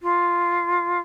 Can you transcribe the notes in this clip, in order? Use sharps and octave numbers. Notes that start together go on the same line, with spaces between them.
F4